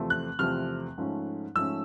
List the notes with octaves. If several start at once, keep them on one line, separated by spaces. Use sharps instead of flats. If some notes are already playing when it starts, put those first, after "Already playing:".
Already playing: E2 C3 F3 A3 C4
F#6
E2 C3 F3 A3 C4 F6
G#2 F3 A3 C#4
G#2 F3 A3 C#4 E6